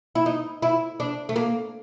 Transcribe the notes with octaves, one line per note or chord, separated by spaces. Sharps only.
E4
D#4
E4
D4
A3
A#3